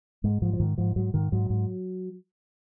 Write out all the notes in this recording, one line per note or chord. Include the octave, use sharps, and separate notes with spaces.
G#2 G#3
G#2 F3
F3
G#2 D#3
G#2 F3
G#2 F#3
G#2 D#3
G#2 F#3
G#2